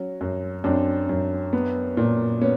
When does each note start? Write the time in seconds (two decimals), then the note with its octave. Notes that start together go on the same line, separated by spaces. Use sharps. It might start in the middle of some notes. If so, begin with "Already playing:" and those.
Already playing: F#3 C#4
0.21 F#2
0.64 F#2 C4 D4
1.09 F#2
1.53 B3
1.97 A#2
2.41 B3 C#4